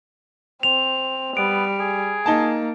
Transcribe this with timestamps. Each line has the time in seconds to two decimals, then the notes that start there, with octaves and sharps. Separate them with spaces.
0.63 C4 F7
1.37 G3 B3 D7
1.80 G#4
2.26 A#3 D#4 A5